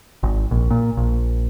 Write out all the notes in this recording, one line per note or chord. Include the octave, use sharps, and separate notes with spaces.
G#1
A#1
A#2
A#1